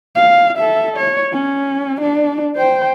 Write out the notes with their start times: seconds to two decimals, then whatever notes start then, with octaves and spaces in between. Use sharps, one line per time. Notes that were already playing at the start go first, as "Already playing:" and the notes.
0.16 F5
0.57 A4 E5
0.97 C#5
1.33 C#4
2.01 D4
2.56 C5 G5